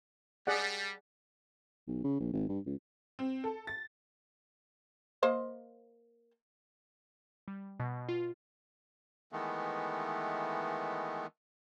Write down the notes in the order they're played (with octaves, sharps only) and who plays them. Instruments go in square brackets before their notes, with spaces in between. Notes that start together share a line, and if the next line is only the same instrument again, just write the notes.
[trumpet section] G3 [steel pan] G#4 D5 F#5
[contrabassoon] B1
C#3
A#1
G#1
G2
C#2
[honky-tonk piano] C4
A4
A6
[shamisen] A#3 C5 D#5
[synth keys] G3
B2
F4
[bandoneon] D#3 E3 G#3 A3 B3